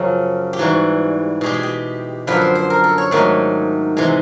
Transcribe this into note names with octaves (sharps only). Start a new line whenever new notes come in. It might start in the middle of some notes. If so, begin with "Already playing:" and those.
Already playing: F#2 C#3 F3 C#4
G4
G#2 E3 G3 F#4
B2 G#3 G4
G#4
G4
F#2 D3 F3 B4
C5
C5
A#4
A4
C#5
G#2 D#3 F#3 A3
C3 E3 G#3